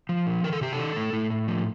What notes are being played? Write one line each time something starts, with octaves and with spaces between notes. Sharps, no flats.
F3
A#2
D#3 A#4
A4
C3 G4
A4
D#3
A2
A2
A2
F3